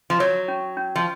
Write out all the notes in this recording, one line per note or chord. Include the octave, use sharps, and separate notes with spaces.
F3
F#3 C#5
C#4
C#4
F3